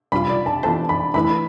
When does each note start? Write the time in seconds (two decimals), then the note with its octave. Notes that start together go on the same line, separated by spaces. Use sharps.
0.12 C3 G3 D4 F4 B5
0.29 D5
0.46 A5
0.63 E3 B3 F4 A4 C5 A5
0.89 B5
1.14 E3 A3 E4 B4 B5